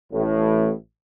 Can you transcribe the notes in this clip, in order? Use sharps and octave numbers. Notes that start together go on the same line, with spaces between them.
A1 A2